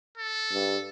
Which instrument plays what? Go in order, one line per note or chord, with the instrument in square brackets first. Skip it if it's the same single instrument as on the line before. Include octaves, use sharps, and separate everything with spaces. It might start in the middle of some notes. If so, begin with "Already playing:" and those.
[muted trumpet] A4
[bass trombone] G2